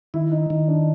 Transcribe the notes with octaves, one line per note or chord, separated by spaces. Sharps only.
D#3 E4
D#4
D#3 D#4
D4